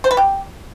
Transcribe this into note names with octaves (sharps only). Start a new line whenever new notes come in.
C5
B4
G4